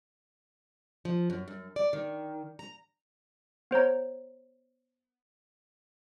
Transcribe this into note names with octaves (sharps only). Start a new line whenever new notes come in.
F3
F#2
F#2
D5
D#3
A#5
B3 C5 C#5 A#5